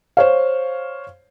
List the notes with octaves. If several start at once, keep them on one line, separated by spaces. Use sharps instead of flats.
C5 C#5 F5